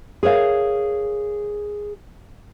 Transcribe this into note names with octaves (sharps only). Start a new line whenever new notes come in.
G#4 A#4 C#5 F5